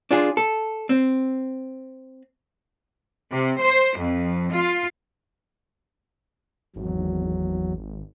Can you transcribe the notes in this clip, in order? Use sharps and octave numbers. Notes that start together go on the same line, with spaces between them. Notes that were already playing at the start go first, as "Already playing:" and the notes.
D4 F4 G#4
A4
C4
C3
C5
F2
F4
G#1 E2 F#3